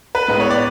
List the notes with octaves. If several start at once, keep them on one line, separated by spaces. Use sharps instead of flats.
B4
A2 G#3 B3 B4
C#5
D5